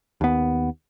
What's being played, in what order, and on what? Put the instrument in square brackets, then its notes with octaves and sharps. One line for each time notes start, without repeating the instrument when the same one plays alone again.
[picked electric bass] D#2 B3